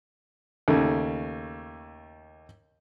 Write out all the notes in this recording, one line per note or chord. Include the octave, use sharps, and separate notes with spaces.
D#2 C#3 A3